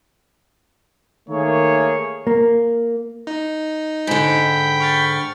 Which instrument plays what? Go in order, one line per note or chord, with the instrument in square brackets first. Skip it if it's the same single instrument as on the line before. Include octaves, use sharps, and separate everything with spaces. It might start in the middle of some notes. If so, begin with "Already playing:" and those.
[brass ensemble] D#3 A3 A#3 G#4 C#5
[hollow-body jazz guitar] A#3
[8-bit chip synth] D#4
[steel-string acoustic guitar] G#2 D3 [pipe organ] G5 B5
[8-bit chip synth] C#6 F6 A6